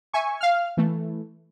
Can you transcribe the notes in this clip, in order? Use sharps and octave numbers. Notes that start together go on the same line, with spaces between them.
E5 G#5 C#6
F5 F6
E3 A3